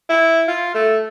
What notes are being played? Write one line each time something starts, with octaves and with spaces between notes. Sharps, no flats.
E4
F4
A3